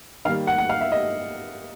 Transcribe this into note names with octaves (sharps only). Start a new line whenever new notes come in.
D#3 G3 A#3 F5
F#5
F#5
F5
E5
D#5